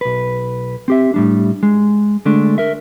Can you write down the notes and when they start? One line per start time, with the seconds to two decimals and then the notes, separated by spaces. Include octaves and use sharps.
0.01 B1 B4
0.88 C4 G4 E5
1.14 A2 G3 D4
1.63 G#3
2.25 D3 G#3 A3 D4
2.58 A#4 E5